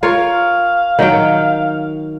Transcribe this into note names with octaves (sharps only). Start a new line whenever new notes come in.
F4 A#4 C#5 F5
D#3 F#3 G5